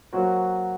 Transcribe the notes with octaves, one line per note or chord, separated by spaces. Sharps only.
F#3 A#3 F#4 C5